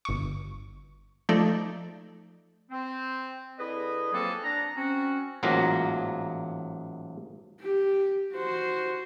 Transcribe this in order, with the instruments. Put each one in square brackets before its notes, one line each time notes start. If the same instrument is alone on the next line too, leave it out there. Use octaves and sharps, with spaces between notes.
[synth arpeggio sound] G1 C#6
F3 A3 D#4 A4 D5
[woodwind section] C4
D3 E4 G#4 B4 D#5
F3 F#3 A#3 C4 G#4 A4
D4 A#5
C4 C#4 F#4
[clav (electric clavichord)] A1 G#2 F#3 A#3 F4 A#5
[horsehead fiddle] G4
F#4 C5